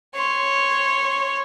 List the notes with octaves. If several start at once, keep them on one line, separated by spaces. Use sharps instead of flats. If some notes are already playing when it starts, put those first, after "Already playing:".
C#5 C6